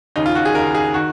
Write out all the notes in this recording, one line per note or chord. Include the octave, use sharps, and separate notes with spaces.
D#2 C#3 D#4
F4
F#4
G#4
D#2 C#3 A#4
G#4
D#3 F#4